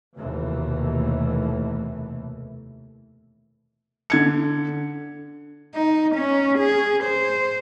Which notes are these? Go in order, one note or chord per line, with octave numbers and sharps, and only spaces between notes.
F1 D#2 B2 E3 A3
D3 G#6 C#7
D#4
C#4
G#4
C5